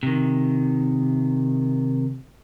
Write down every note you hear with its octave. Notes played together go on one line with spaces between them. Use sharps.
C3 D#3